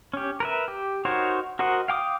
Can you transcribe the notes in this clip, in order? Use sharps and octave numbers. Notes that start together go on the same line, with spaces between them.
C#4 G4
A#4 B4 E5
G4
D#4 F#4 A#4 C5 C#5
F#4 A#4 C5 D#5 F#5
F5 G5 D6 D#6